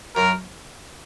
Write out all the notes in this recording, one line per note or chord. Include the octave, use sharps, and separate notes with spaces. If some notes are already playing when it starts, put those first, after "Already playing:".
F#2 A#4